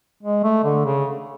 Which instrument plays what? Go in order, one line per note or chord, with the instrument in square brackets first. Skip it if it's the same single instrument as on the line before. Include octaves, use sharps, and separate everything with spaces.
[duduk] G#3
A3
D3
C#3